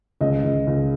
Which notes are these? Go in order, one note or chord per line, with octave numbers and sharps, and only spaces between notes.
C#2 D#5
C#2
C#2